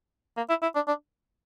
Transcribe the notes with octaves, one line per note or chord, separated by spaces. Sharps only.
A#3
E4
E4
D4
D4